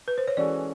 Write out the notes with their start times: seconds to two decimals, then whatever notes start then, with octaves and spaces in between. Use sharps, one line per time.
0.08 B4
0.18 C5
0.28 C#5
0.37 E3 G#3 C#4 F#4 A4 D5